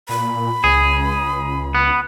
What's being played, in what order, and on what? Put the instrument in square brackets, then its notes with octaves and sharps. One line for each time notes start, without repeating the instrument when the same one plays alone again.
[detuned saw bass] A#2 [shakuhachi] B5
[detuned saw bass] C#2 [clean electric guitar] G#4
[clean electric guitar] B3